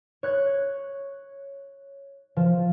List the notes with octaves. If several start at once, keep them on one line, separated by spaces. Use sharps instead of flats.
C#5 F#6 G#6
F3